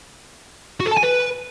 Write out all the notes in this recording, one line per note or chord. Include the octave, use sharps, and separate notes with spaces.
F#4
A4
A5
G#5
B4